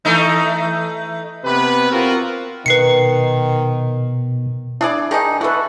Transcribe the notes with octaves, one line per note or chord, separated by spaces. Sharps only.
E3 A3 D#4
C3 B3 B4
C4 F4 F#4 A#4
B2 D#3 B4 C7 C#7
D4 E4 G#4 D5
D#3 D4 D#4 G#4
D3 E4 F#4 A4 B4